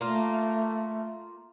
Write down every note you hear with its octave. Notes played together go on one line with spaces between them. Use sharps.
A3 A#3 F4